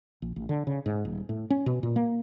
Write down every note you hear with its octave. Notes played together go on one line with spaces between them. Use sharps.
A#1
A1
D3
C#3
G#2
D#1
A2
C#4
B2
A#2
A#3